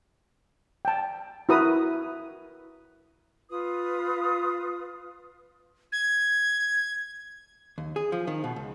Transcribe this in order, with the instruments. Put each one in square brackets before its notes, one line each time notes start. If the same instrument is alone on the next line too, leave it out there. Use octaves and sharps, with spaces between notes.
[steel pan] G5 A5
E4 F#4 A#4 B4 A#5 D#6
[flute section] F4 B4 D#6
[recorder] G#6
[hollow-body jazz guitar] D#2
G#4
F3
D#3
B2
C#2